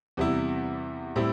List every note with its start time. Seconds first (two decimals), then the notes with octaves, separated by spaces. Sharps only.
0.17 E2 C3 G3 E4
1.16 A2 G3 C4 E4